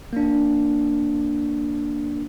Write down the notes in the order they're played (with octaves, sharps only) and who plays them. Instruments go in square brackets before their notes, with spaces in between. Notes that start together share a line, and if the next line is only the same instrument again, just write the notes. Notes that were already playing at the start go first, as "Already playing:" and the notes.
[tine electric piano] A#3 D4